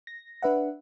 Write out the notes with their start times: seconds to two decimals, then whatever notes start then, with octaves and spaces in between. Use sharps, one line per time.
0.07 A#6
0.42 D4 B4 E5 F#5